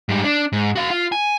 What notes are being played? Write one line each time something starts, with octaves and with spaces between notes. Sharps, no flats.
G#2 G3
D4
G#2
F#4 F5
F4
G#5